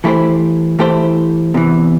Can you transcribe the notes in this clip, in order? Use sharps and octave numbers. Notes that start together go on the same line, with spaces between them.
E3 A3 E4 G4 C5
E3 A3 E4 G4 C5
E2 C3 E3